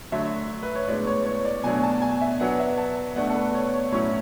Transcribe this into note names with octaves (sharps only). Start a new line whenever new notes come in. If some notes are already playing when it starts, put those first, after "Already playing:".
D3 F#3 A3 E5
B4
C#5
A2 G#3 B3 D4 D5
C#5
C#5
D5
B2 F#3 A3 D4 G#5
A5
G#5
E5
F#3 B3 D4 F#5
E5
A5
B2 A3 D4 F#5
A4
B4
C#5
C#5
A2 F#3 C#4 E4 C#5